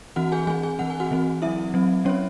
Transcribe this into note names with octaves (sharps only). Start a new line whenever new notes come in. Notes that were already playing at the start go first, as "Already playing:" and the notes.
E3 C4 F#4 F#5
G#4 G#5
E3 C4 G#4 G#5
G#4 G#5
E3 C4 F#5
G#5
F#4 F#5
E3 C4
F#3 C4 E4 E5
F#3 C4
F#3 C4 C#4 C#5